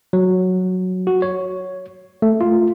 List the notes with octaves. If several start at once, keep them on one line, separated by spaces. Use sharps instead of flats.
F#3
F#4
C#5
A3
F4